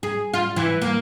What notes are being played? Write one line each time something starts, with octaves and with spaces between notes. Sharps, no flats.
G#4
F4
E3
A#3